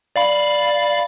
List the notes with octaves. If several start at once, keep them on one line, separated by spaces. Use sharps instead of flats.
D5 F5 B5